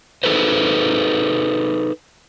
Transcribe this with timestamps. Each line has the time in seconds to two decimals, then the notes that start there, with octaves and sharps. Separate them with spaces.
0.24 D#4 G#4 A4 B4 C5